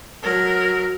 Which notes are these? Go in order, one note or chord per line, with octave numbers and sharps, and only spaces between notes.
F#3 A#4